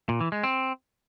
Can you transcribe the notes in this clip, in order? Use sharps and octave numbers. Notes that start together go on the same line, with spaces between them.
A#2
E3
G#3
C4